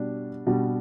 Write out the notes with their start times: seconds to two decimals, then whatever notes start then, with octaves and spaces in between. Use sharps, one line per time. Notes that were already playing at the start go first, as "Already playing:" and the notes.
Already playing: B2 G3 D4
0.47 B2 G3 D4